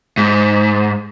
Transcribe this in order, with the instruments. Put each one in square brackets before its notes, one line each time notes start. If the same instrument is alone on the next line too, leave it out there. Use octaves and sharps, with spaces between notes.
[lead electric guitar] G#2